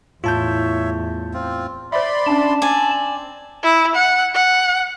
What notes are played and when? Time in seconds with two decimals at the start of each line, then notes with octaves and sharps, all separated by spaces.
0.24 E2 A2 F4 C#5 E5 A5 G6
1.34 C4 F4
1.92 C5 D5 E5 B5 C6
2.26 C#4 D4 A5
2.62 C4 D5 G#5
3.63 E4
3.95 F#5
4.35 F#5